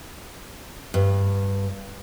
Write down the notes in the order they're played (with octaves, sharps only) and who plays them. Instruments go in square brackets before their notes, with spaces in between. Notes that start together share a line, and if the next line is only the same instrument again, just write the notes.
[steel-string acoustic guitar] G2